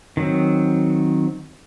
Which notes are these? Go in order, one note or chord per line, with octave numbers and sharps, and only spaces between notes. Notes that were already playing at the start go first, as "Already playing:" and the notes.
D#3 F#3 C4